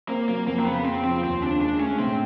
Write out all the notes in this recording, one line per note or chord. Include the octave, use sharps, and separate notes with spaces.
A#3 C4
F#3 A#3
F2 A#3
C4
C#3 B3
F2 C4
F3 C4
D#2 C4
C#3 D4
G#3 D4
A3 C#4
A2 C4